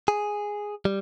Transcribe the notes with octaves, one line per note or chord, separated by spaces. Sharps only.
G#4
G3